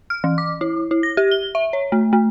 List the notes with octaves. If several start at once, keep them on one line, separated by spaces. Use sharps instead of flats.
F6
E3
D6
E4
E4
A#6
G4
G7
E5
C#5
A3
A3